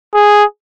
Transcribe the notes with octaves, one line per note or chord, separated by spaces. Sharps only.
G#4